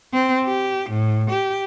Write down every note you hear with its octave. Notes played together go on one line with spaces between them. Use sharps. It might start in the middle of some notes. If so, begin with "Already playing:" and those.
C4
G4
A2
G4